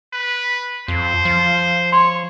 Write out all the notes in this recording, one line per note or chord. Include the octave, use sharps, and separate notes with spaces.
B4
F2 C5
F3
C#5 C6